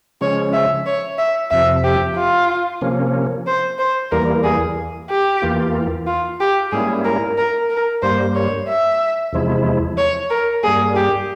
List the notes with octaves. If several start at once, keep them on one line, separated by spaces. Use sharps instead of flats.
C#3 F3 G#3 C#4 C#5
E5
C#5
E5
F2 C3 F3 E5
G4
F4
C3 F3 A#3 C#4
C5
C5
E2 E3 G3 A#3 A#4
G#4
G4
E2 E3 A#3 F4
F4
G4
G#2 G3 A#3 C#4 E4 G#4
A#4
A#4
A#4
G2 G3 A#3 C5
C#5
E5
E2 C3 F3 G#3 E4
C#5
A#4
G2 G3 A#3 G#4
G4